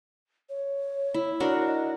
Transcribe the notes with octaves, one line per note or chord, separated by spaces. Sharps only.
C#5
E4
D4 F#4 A#4
D#5